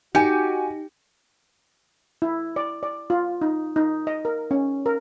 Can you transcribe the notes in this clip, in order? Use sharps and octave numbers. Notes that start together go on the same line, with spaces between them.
D#4 F#4 G4 G#5 C#7
E4
D5
D5
F4
D#4
D#4
D#5
A#4
C#4
A#4